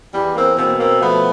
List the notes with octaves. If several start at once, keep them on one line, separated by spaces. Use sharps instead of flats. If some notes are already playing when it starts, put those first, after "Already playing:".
E2 G3
A#3 C4
B2 A#3 C4
A#3 C4
F3 A3 B3